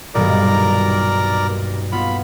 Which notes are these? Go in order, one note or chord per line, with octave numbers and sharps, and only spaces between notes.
D#1 B1 G2 A#4 D5 A#5
B3 F4 B5